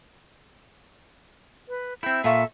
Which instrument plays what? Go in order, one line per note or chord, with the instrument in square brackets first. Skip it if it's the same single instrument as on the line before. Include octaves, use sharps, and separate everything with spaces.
[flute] B4
[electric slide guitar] C4 E4 [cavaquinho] E5 G5 [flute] G6
[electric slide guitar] A#2 [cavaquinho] F4 C#6 [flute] A4 [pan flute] E5